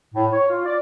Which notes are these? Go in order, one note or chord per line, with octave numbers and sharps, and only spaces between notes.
A2
C#5
F4
D5